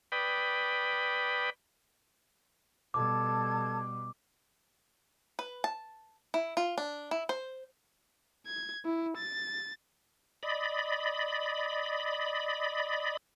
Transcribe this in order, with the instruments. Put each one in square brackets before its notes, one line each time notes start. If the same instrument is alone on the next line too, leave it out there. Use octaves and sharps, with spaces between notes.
[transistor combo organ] B4 D5 G5 B5 D#6
[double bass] B2 G3 [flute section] A4 A5 G#6 [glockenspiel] D6
[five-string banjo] B4
A5
E4
F4
D4
E4
C5
[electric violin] G#6
E4
A6
[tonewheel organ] D5 D#5 B5